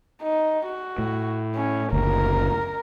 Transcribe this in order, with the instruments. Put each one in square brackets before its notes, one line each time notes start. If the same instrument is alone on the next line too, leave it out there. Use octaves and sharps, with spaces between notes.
[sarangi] D#4
F#4
[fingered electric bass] A2
[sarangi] C#4
[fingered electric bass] F#1 D2 [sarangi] A#4